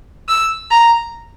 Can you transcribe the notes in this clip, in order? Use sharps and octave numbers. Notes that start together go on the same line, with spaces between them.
E6
A#5